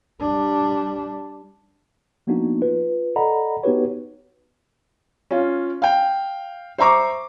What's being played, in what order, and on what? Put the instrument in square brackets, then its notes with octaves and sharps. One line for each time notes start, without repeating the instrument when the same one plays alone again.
[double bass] G3 D4
[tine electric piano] F3 A#3 B3 D4 D#4 F#4
F4 B4
A4 D5 D#5 F#5 A#5 B5
B3 D#4 F#4 G4 B4 C#5
[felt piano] C#4 F4
F5 G5
C5 E5 A#5 C#6 D6